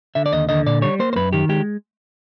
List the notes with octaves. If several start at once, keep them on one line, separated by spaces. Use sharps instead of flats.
D3 E5
D5
D#2 D#5
D3 D#5
A#2 D5
G3 C#5
A#3 C5
C5
F#2 B4
D#3 G4
G#3 G4